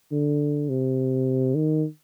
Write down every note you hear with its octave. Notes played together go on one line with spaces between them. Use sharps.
D3
C3
D#3